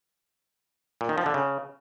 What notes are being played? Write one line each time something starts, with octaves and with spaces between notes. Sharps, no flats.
A#2
D#3
F3
D3
C#3